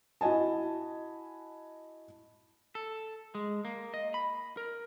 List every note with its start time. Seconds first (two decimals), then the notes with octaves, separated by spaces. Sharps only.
0.21 E4 F#4 D#5 G#5 A5
2.75 A4
3.35 G#3
3.65 A#3
3.94 D#5
4.14 B5
4.57 A#4